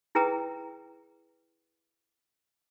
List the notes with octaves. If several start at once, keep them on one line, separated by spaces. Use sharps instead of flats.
E4 G#4 B4 G5 A#5 D#6